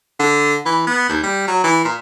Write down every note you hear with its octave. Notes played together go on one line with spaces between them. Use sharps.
D3
E3
B3
D#2
G3
F#3
E3
A#2